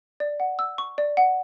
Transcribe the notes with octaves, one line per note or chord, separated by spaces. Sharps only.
D5
F#5
E6
C#6
D5
F#5